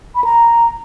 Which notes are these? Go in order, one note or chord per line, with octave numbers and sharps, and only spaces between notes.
B5
A#5